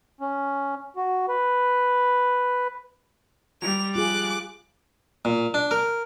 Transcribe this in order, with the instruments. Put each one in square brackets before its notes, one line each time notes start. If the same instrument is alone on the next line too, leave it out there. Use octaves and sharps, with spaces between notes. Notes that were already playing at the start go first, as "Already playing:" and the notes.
[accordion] C#4
F#4
B4
[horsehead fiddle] G3 [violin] F7
[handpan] F4 G#4 [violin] D6 F#6
[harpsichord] A#2
D4
A#4